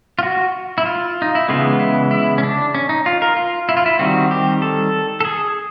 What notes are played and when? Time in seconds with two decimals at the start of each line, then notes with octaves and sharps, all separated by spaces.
0.19 F4
0.23 F#4
0.78 E4
0.85 F4
1.22 D#4
1.35 E4
1.48 C#3 E3 G#3 B3 F4
1.80 E4
2.11 E4
2.38 C#4
2.43 D4
2.75 C#4
2.89 D#4
3.06 F4
3.22 A#4
3.37 F4
3.69 E4
3.77 F4
3.86 E4
3.99 D#3 G3 C4 F#4
4.31 G4
4.62 A4
5.21 A4
5.25 G#4